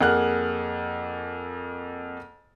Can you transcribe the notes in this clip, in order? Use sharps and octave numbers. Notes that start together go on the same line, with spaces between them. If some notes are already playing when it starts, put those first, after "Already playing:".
F2 A#3 G#4 F#5 F6 F#6